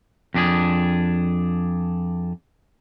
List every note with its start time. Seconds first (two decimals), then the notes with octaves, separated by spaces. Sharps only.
0.34 F2 D4 G#4